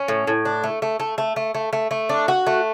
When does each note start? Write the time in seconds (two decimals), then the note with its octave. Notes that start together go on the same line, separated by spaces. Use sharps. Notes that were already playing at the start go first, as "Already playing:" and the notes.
Already playing: C#4
0.08 A2
0.27 A2
0.45 D4
0.64 A3
0.82 A3
1.00 A3
1.18 A3
1.36 A3
1.55 A3
1.73 A3
1.91 A3
2.09 D4
2.28 F#4
2.47 A3